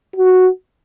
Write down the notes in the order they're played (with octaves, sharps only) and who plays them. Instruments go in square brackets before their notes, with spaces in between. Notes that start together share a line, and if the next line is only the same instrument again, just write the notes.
[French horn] F#4